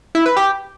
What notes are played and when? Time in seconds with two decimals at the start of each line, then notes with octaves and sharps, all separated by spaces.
0.15 E4
0.26 B4
0.37 G4